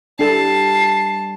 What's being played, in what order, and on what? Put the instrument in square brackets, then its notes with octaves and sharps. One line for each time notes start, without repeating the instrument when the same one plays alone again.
[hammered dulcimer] G3 [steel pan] D4 A4 [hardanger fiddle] A5 [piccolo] C7